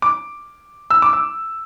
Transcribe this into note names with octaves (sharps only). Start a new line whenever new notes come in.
D6
E6
D6
E6